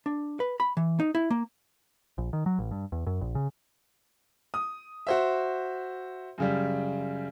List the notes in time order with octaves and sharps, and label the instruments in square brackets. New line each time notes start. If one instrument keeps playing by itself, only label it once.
[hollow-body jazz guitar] D4
B4
B5
E3
D#4
E4
A#3
[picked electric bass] A#1
D#3
F#3
A1
G2
E2
F#2
A#1
C#3
[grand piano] D#6
F#4 C5 E5
F#2 C#3 G3